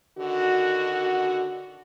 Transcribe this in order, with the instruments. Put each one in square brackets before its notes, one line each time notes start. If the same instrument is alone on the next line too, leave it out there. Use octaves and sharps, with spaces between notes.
[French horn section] D3 D#3 F#4